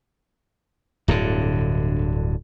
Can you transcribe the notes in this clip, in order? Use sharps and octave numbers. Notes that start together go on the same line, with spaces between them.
D1 G2 D3